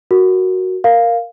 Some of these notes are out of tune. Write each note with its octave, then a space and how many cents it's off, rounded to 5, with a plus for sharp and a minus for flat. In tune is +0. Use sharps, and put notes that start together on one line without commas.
F#4 +0 A#4 +0
A#4 +0 F5 +0